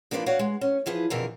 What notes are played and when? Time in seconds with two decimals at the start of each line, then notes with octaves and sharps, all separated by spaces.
0.11 F3 A#3 D4 F4 B4 D5
0.26 F#4 C#5 D5 F5 F#5
0.39 G#3
0.61 C#4
0.86 E3 F3 G#4 B4
1.10 F2 B2 D3 E3 G#4 A#4